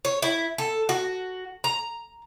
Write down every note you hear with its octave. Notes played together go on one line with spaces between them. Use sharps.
C#5
E4
A4
F#4
A#5